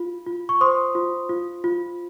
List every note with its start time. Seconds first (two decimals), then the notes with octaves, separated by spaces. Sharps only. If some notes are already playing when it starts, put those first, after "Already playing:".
Already playing: F4
0.26 F4
0.49 C#6
0.61 C5 C6 D#6
0.95 F4
1.29 F4
1.64 F4